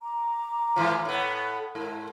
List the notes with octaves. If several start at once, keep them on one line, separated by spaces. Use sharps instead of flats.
A#5 D6
G#2 E3 F3
A2 B3
G#2 E4 A4 A#4